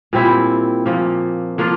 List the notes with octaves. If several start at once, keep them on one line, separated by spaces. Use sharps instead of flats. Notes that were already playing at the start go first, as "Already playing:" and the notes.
A#2 G3 C4 E4
A#2 F3 A#3
F3 A#3 D4 F4